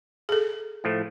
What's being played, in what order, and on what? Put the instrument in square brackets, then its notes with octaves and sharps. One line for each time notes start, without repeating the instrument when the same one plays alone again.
[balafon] G#4 A4
[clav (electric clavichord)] A2 F3 A3